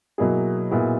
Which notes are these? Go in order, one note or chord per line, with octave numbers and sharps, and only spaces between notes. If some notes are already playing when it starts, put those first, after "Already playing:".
B2 F#3 A#3 E4 G#4
A#2 F#3 B3 E4 G#4